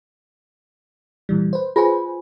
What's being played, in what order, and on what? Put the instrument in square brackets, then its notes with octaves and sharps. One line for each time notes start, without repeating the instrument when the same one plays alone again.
[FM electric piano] A#2 E3 G3
B4 C5
[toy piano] F4 G#5 [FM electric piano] G#4 B4 C5